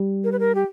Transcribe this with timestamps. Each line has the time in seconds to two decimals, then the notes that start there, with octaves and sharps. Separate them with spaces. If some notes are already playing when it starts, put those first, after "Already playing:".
Already playing: G3
0.24 A#4
0.32 B4
0.39 A#4
0.55 G4